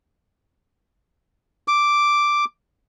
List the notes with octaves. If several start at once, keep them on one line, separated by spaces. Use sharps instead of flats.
D6